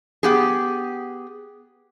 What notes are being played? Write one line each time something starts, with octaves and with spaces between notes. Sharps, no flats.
B3 G4 G#4